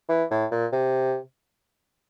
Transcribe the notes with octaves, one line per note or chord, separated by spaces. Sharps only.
E3
A2
A#2
C3